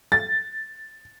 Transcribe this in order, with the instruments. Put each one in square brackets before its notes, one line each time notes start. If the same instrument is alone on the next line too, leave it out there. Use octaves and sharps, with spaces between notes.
[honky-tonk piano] A6